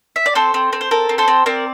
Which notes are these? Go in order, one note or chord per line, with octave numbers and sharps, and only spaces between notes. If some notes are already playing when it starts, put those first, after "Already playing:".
E5
D5
C4 A4 C5
C4
C4
C5
A4 A#4
C4
A4 C5
C4
C4 A#4 D5